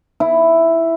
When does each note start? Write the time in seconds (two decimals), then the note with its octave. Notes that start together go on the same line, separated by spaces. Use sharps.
0.20 E4